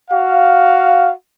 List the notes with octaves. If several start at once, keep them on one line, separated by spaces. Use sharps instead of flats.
F#4 F5